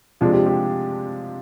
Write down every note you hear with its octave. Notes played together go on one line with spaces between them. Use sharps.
C3 F3 G#3 D4 F4
G4
G4